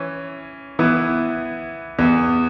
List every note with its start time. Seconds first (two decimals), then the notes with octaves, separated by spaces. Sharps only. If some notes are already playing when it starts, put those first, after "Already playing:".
Already playing: E3 C#4
0.79 E3 B3 E4
1.98 E2 E3 B3